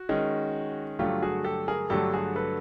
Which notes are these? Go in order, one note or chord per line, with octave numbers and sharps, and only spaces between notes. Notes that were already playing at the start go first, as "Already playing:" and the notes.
Already playing: F#4
D#3 G#3 C#4
G2 D3 F#3 A3 F4 G4
F#4 G#4
G4 A4
G#4 A#4
G2 D3 F#3 A3 G4 A4
F#4 G#4
A4 B4